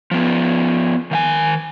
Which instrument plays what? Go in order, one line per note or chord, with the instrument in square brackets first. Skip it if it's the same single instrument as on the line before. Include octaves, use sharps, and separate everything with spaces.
[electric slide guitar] F3 B3
D#3 F5 G#5